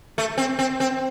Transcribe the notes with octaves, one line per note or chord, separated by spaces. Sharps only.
A3
C4
C4
C4